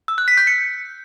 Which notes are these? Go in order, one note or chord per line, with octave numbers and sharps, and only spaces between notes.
E6
F#6
B6
G6
C#7